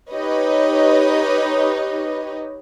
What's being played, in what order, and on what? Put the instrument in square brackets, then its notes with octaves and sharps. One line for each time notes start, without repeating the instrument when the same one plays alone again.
[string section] D#4 G4 B4 C#5 D#5